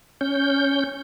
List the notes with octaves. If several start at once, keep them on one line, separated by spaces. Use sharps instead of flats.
C#4 G6